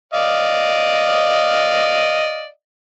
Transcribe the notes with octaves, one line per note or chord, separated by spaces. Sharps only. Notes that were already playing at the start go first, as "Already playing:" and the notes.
D5 D#5 F5